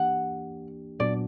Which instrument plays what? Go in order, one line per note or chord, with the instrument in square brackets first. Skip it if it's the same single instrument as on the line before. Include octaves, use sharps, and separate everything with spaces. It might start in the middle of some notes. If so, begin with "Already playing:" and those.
Already playing: [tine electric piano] E3 A#3 D4 G4 [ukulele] F#5
[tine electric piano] A#2 F#3 B3 D4 F#4 [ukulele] D5